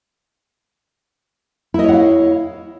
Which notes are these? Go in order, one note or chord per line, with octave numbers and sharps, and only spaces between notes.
E4 C#5 D#5 F5 F#5